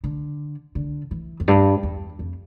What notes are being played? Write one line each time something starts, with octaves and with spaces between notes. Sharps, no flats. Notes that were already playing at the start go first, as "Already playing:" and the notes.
D3
D3
E3
F2
G2
E2
F2